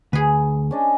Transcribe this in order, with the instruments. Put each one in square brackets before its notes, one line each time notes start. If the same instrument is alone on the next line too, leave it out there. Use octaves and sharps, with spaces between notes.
[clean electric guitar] D2 [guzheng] G#4 B4
[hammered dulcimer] C#4 D4 D#5